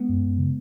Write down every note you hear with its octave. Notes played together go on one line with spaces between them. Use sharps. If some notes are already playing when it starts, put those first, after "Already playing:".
Already playing: G#3 B3
F#2
F#2
C#3